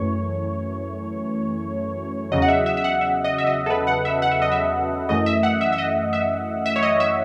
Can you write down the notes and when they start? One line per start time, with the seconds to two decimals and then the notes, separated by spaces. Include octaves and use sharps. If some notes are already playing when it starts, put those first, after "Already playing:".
Already playing: F#2 E3 A3 C#5
2.32 E2 C#3 F#3 D#5
2.42 F#5
2.48 E5
2.66 E5
2.77 E5
2.84 F#5
3.01 E5
3.24 D#5
3.38 E5
3.47 D#5
3.66 A4
3.70 B4
3.87 F#5
4.05 E5
4.22 F#5
4.31 E5
4.42 D#5
4.52 E5
5.09 F#2 E3 A3 D#5
5.26 E5
5.43 F#5
5.61 E5
5.72 E5
5.78 D#5
6.13 E5
6.66 E5
6.76 C#5
6.83 D#5
7.00 E5